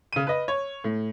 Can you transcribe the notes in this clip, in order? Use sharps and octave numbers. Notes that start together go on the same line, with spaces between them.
C#3 D#7
B4 D#5
C#5
A2